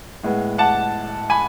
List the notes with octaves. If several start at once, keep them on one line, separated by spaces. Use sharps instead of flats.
A2 G#3 B3
F#5 A5
G#5 B5